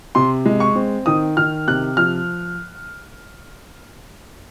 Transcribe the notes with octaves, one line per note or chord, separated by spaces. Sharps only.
C3 C6
G#3
C#6
C4
D#3 D#6
D#3 F6
C3 F#6
F3 F6